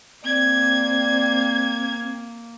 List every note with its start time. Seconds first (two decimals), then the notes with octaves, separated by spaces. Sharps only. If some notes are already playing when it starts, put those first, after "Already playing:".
0.24 A#3 C4 D5 G#6